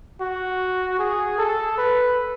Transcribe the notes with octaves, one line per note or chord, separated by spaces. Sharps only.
F#4
G#4
A4
B4